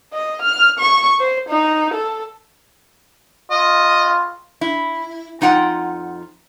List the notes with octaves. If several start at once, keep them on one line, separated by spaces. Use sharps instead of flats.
D#5
F6
C#6
C5
D#4
A4
F4 D#5
E4
F2 D#4 F4 F#5 G5